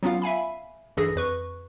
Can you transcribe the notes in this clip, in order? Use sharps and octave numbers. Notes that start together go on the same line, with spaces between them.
F#3 B3 C#4 F4 F5
E5 F5 G#5 B5
B1 G2 E3 G#4 A4 A#6
F2 B4 C#6